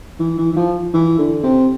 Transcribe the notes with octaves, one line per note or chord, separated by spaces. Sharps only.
E3
E3
E3
F3
E3
D3
C3